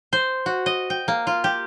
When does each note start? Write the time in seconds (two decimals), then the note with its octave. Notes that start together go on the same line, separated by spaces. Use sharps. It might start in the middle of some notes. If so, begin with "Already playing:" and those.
0.13 C5
0.46 F#4
0.66 D#5
0.90 G5
1.08 A#3
1.27 F4
1.44 G4